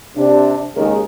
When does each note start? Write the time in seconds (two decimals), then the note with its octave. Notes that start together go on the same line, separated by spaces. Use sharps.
0.17 C3 D4
0.76 D#2 C#3 G#3 D#4 A#4